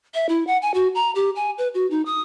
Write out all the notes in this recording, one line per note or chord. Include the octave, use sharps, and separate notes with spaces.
E5
E4
F#5
G#5
F#4
A#5
G4
G#5
B4
F#4
D#4
D#6